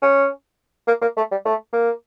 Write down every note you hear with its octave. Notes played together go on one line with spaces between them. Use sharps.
C#4
A#3
A#3
A3
G3
A3
A#3